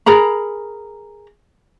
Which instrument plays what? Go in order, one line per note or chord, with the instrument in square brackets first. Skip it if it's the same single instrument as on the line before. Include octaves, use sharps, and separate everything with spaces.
[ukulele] G#4 A#4 A#5 B5